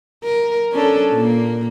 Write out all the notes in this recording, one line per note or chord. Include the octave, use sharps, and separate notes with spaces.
A#4
C#4 D4 A4
A#2 A#3